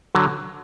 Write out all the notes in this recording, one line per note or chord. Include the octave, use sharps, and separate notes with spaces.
D3 F#3